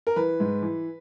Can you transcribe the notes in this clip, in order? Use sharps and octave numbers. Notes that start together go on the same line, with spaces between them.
A#4
E3 B4
G#2
E3